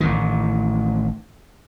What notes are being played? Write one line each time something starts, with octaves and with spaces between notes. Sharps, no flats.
A1 A2 D#3